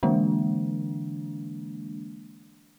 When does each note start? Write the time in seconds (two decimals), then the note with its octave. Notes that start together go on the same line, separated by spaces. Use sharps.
0.03 D3 E3 G#3 A#3 D4